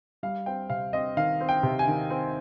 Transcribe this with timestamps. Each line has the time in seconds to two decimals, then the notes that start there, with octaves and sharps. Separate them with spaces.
0.23 G3 F5
0.46 C4 G5
0.70 C3 F5
0.93 C4 D#5
1.17 D#3 F5
1.41 C4
1.49 G5
1.63 C3
1.79 G#5
1.87 D#3
2.10 C4